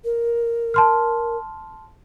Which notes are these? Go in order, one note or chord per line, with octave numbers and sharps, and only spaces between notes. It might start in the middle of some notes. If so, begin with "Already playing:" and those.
A#4
A5 C6 F6